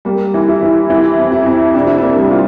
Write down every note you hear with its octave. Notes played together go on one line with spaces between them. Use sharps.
G3 A#3
E3
E4
E3
E3 E4
F2
E4
F2
C3 D4
E4
A#3 D4
G3
F4